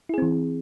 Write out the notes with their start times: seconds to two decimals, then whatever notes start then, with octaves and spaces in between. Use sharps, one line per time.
0.09 E4
0.14 G#4
0.18 C4
0.22 E3